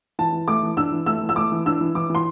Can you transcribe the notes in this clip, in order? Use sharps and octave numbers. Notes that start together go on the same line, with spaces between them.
E3 A5
E3
A3 D6
E3
D4 E6
E3
A3 E6
E3
E6
A3 D6
E3
D4 E6
E3
E3 D6
E3 C6